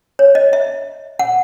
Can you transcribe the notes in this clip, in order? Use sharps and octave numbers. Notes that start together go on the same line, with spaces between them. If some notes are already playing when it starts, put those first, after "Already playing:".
C#5
D#5
E5
F#5